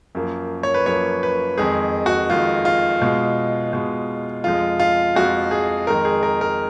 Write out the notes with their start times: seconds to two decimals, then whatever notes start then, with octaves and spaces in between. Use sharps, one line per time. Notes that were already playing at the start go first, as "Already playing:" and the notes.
0.15 F#2 F3 A#3
0.63 C#5
0.74 B4
0.86 F#2 F3 A#3 C#5
1.23 B4
1.58 F2 D#3 G#3 G#4
2.06 F#4
2.30 F2 D#3 G#3 F4
2.65 F4
3.01 B2 G#3
3.73 B2 G#3
4.44 F2 F3 G#3 F4
4.80 F4
5.15 F2 F3 G#3 F#4
5.51 G#4
5.87 F2 D#3 G#3 A#4
6.05 G#4
6.23 A#4
6.41 A#4